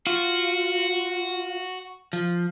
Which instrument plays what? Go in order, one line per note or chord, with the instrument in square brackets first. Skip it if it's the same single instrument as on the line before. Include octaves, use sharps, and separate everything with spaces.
[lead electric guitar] F4 [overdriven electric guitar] F#4
[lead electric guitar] F3